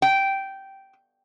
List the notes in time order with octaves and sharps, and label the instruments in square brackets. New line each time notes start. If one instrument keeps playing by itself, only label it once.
[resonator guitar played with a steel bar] G5